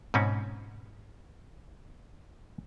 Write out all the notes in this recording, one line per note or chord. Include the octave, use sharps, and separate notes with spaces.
G#2 B2 C4 C#4